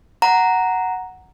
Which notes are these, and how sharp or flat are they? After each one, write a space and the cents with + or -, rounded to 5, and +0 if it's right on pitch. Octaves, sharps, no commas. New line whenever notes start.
F#5 +0 A#5 +0